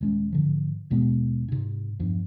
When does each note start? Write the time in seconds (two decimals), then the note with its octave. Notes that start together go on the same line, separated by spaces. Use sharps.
0.01 D#1 G#3 C#4
0.32 G#2 D3 F3
0.90 D#2 B2 G#3 B3
1.48 G#2 C3
1.99 E2 G2 F3